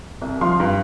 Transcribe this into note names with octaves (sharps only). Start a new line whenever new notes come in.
C2
F3 F5 C6
G2